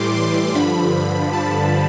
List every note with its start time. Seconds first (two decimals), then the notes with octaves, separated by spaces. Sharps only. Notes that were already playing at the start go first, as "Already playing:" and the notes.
Already playing: A2 E3 G3 C6 D6
0.16 C6
0.54 G2 D3 F3 B5
1.33 A5